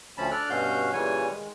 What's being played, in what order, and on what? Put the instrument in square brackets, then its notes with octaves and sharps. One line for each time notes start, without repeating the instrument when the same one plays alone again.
[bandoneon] D2 F3 C#4 A5 B5
D4 A4 D5 F6 F#6
G2 B2 C#4 F#4 F5 G6
A#2 C#3 E3 G3 C#5 G#5
D#3 G#3